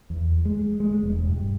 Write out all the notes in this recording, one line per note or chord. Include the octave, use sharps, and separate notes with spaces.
E2
G#3
G#3
E1
G2